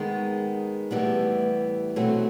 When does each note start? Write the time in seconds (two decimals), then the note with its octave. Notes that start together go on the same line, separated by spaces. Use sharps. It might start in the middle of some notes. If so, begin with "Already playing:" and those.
Already playing: D#3 G#3 B3
0.91 A2 E3 G3 B3
1.96 B2 F#3 A3 C4